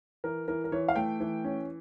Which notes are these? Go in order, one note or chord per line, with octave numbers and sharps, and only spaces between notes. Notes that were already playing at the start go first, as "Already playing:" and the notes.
E3 A#4
E3 A#4
A#4
E3 C#5
F5
A3 G5
E3
C#4